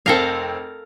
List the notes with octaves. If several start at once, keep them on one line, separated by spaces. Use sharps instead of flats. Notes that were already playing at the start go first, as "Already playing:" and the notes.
F1 C4 A4 A#4 F5